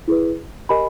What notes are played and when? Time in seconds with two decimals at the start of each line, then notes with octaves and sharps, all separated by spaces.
0.08 E4 G#4 B4
0.69 G4 A#4 D#5 G#5 B5